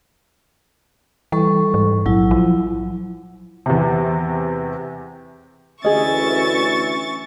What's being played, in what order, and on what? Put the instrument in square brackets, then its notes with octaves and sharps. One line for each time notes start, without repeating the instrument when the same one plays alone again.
[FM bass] E3 [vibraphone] G3 A4 C#6
[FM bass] G#2
[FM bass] A#1 [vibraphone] F#3 E4
[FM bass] F3
[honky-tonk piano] E2 C3
[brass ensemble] D2 E3 [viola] C#4 E5 [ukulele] G#4 D#5 [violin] C#6 A6